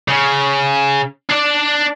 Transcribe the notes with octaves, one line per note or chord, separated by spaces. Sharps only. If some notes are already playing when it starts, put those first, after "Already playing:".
C#3
D4 D5